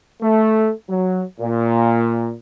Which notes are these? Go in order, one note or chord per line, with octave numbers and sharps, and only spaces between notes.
A3
F#3
A#2